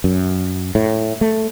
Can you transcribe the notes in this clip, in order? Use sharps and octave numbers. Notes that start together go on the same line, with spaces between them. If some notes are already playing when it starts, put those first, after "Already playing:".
F#2
A2
A3